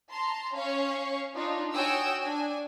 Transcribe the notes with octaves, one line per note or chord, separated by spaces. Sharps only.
A5 A#5 C6
C#4 C#5 F5 C#6
D4 D#4 F4
F#4 C#5 G5 G#5 D#6 E6
D4 G#5